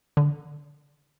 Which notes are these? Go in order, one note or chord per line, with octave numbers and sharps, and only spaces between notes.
D3